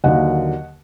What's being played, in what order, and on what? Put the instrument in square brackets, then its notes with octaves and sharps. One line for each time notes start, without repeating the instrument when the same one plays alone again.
[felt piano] D#2 D3 F#3 A#3 D#5 F#5